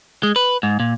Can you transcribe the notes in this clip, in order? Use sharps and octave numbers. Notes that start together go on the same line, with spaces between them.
G#3
B4
G#2
A#2